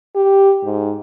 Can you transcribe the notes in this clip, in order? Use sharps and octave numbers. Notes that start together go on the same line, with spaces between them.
G4
G#2